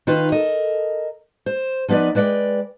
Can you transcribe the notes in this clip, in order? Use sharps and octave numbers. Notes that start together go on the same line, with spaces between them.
D#3 D#4 F4 B4
A4 A#4 D#5
C5
F3 B3 D#4 B4 D5
G#3 B4 D5 F#5 G5